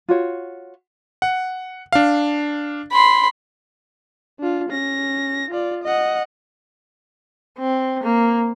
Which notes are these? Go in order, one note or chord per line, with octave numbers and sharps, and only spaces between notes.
F4 F#4 C#5
F#5
D4 F5
B5 C6
D4 F4
C#4 A#6
F4 D5
D#5 F#5
C4
A#3